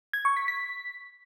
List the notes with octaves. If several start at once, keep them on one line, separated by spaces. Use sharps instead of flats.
G#6
C#6
B6
B6